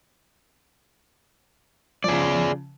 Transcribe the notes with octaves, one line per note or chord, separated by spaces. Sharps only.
C#3 F3 G#4 D5